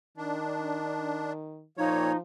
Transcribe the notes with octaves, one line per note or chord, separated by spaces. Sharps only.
D#3 D4
A#2 F3 A#3 D#4 C#5